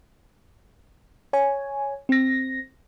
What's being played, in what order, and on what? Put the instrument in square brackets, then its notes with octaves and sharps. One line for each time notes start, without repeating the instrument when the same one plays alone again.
[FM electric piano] C#5 G#5
C4 A#6